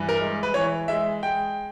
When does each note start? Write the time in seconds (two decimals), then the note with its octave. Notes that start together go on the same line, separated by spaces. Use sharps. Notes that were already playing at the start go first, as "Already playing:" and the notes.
Already playing: G2 E3
0.09 A#4
0.20 G#3
0.43 B4
0.54 E3 C#5
0.88 G#3 E5
1.23 G#3 G5